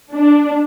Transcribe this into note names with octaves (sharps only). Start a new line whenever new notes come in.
D4